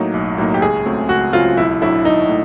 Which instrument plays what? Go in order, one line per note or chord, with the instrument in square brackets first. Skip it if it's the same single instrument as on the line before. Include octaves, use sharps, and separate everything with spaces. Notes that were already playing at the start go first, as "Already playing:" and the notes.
Already playing: [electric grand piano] A2 F#3 A#3 D#4
B1
A2 F#3 A#3 D#4
[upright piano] G4
[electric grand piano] C#2 [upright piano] G#4
[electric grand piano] C#3 F#3 A3 C4
[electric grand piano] C#2 [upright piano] F#4
[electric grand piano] C#3 F#3 A3 C4 [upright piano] F4
[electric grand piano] B1 [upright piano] E4
[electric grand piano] A2 F#3 A3 D4 [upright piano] E4
[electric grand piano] B1 [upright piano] D#4
[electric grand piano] A2